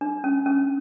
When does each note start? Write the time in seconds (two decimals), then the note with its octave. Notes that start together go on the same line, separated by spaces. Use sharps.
0.01 D4
0.24 C#4
0.46 C#4